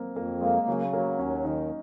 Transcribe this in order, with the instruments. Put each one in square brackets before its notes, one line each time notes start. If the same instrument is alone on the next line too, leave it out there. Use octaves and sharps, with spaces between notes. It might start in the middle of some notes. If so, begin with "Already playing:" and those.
Already playing: [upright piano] F#3 A#3 C4
[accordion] F2 [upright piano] A#3
[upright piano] G#3 [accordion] A#3
[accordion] C#3 [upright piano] F#3
[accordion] F#3 [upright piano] A#3
[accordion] D#2 [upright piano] C#4
[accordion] D#3 [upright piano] D#4